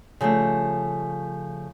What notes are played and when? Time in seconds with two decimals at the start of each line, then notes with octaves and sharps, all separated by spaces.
0.21 C#3 F3 G3 A3